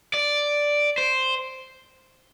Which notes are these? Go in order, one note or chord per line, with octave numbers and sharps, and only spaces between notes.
D5
C5